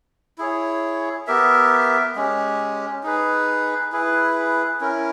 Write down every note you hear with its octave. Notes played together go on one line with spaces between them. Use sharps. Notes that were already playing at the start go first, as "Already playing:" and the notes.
E4 G#4 C#5
B3 G4 A#4 E5
G#3 C#4 G4
D#4 G#4 B4
E4 G#4 B4
C#4 E4 A#4